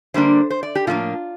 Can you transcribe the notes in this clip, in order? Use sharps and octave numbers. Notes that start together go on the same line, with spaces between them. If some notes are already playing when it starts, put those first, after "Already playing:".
D3 G3 A#3 D4 C5
C5
D5
G4
A2 F3 A#3 D4 F4